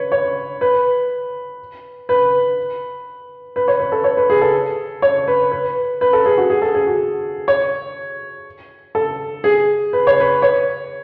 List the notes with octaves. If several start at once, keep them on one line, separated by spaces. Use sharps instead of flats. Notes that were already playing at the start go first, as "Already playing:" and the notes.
Already playing: B4 C#5
C#5
B4
B4
B4
C#5
B4
A4
C#5
B4
G#4
A4
C#5
B4
B4
B4
A4
G#4
F#4
G#4
A4
G#4
F#4
C#5
A4
G#4
B4
C#5
B4
C#5